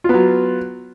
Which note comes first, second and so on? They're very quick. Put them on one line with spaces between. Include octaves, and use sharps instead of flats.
F4 B3 F#3